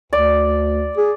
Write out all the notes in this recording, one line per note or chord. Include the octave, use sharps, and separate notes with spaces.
D2 D5
G#4